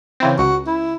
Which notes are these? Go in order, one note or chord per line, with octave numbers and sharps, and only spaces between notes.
C#3 E3 C4
C#2 F#4
E4